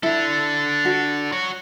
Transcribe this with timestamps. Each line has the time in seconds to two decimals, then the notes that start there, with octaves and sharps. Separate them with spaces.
0.03 D4 E4 A4
0.85 F#4
1.32 F#4 C#5